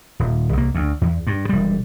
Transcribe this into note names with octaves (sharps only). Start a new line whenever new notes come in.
D#1
C2 A#3
D2
E2
G2
E1 G3